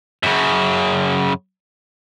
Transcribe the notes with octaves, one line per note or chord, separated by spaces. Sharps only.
F#2 C#3